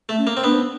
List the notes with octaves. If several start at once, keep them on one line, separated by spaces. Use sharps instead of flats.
A3
C#4
A#3
C4
B3 D4